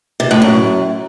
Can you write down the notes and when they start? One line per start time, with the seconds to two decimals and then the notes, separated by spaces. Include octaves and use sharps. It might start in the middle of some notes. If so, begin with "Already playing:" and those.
0.20 C3
0.31 A2
0.42 F#2